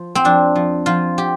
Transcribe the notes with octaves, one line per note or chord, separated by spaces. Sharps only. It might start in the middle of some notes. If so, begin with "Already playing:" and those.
Already playing: F3
C4
F2 D4
F3
F3 F4
G4